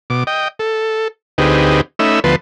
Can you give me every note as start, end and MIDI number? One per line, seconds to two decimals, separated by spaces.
0.10 0.24 47
0.10 0.24 86
0.27 0.48 75
0.27 0.48 79
0.59 1.08 69
1.38 1.81 38
1.38 1.81 60
1.38 1.81 63
1.38 1.81 67
1.38 1.81 68
1.38 1.81 71
1.99 2.20 57
1.99 2.20 61
1.99 2.20 63
1.99 2.20 76
1.99 2.20 83
1.99 2.20 88
2.24 2.36 38
2.24 2.36 53
2.24 2.36 59
2.24 2.36 71
2.24 2.36 81
2.24 2.36 84